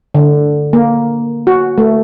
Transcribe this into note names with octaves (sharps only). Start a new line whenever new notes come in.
D3
A#3
F#4
A3